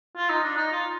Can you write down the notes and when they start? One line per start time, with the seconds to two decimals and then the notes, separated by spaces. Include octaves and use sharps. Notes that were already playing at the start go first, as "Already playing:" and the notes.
0.16 F4
0.29 D#4
0.44 D4
0.57 D#4
0.72 F4